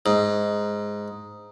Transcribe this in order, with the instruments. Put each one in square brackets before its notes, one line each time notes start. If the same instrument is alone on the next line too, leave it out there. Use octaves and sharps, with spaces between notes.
[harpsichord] G#2